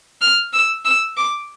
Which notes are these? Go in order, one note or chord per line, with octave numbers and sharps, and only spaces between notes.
F6
E6
E6
D6